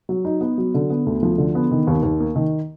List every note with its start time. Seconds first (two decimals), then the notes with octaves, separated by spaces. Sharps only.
0.09 F#3
0.25 D#4
0.41 B3
0.58 F#3
0.74 D3
0.90 B3
1.06 D2
1.23 F3
1.38 D3
1.55 B3
1.71 D#3
1.87 D#2
2.03 D#2
2.20 A#3
2.36 D#3